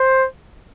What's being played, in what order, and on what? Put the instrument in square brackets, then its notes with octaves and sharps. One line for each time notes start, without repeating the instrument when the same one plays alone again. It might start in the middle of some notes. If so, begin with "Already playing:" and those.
Already playing: [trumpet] C5